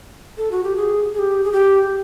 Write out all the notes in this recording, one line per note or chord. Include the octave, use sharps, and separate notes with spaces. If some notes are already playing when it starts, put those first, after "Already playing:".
A4
F#4
G4
G#4
G#4
G4
G#4
G4